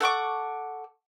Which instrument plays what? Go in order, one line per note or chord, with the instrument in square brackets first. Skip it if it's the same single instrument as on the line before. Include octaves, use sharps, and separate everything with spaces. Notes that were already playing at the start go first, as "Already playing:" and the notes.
[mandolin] A4 F#5 C#6 D6